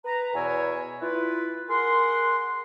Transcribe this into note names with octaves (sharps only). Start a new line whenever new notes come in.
B4 A#5
E2 B2 E4 C#5 G#5
E4 F4 B4
G#4 A#4 F#5 C6